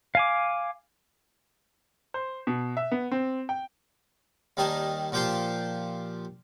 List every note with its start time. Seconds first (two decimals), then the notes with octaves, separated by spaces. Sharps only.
0.15 F5 G#5 D6
2.14 C5
2.47 B2
2.77 E5
2.92 B3
3.12 C4
3.49 G5
4.57 D#2 D#3 G3 D#5 G#5 A5
5.12 A#2 F3 G4 G5 A5 C6